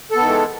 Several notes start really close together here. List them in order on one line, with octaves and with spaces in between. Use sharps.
A4 B3 D#3 E3 G#3